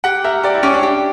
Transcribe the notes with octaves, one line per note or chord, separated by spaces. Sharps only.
G4 F#5
A#4 E5
G4 D5
E4
C#4 G4
D4
G4